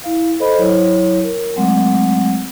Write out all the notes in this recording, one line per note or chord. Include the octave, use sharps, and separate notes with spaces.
E4 F5
A4 C5 D#5 B5
F#3 E4 C#5
A#4
F#3 G#3 A3 C4 F#5